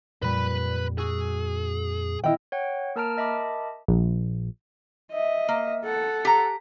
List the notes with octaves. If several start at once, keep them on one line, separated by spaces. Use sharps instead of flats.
F2 A#2 G3 B4 B5
F#4 G#4 E6
D#3 B3 E4 D#5 F5 G5 E6
C#5 F#5 G5
A#3 A#4 A5 A#5 F6 D7
A#4 D#5 E5 A5 B5 D6
A#1
D#5 E5
A#3
A4 F#5
G4 A#5